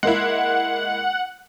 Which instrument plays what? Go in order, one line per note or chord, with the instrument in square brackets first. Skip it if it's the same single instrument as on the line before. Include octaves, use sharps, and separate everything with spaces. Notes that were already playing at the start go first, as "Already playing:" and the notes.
[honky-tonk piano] G#3 A#3 E4 [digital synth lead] F#5